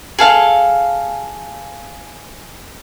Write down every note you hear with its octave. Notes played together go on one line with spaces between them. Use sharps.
G#4 A4 F5